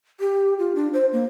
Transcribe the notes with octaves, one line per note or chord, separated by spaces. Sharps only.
G4
F4
D4
C5
A#3